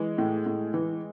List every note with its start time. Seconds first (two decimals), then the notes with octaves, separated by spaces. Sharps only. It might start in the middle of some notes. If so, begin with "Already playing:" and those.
Already playing: E3 G#3
0.18 A2
0.46 A2
0.74 E3